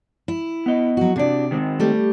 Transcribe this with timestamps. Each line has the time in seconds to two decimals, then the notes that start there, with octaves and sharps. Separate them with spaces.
0.28 E4
0.66 B3 D#5
0.97 F#3 F#4
1.16 C3 D4 F#4 D5
1.51 D#3 G#3 C4
1.80 G3 A3 G4